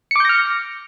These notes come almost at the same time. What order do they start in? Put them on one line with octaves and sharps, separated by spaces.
C#7 D6 G6 A#6 F6